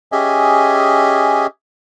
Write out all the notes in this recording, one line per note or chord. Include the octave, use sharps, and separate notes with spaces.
C#4 G4 G#4 D#5 E5 G#5